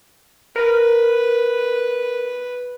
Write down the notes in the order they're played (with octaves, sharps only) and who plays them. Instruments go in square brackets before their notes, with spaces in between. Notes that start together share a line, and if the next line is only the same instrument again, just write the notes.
[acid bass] A#4 [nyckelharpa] B4